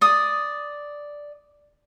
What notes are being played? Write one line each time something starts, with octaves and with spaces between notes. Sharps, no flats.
D5 D#6